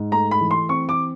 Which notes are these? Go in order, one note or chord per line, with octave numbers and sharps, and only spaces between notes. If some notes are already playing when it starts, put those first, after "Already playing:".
Already playing: G#2
A3 A#5
B5
E3
C6
C4 C#6
D6